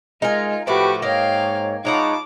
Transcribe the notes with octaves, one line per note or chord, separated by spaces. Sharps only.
G#3 D#4 F4 A#4 G#5
A2 F3 A3 F#4 G4 B4 B5 D6
G#2 A#3 C#5 D#5 F5 G5
G#3 D#4 F4 C#5 F#5 A5 B5 D6